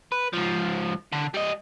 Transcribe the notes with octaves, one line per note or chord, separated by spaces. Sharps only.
B4
G#2 F3
D3
G3 D#5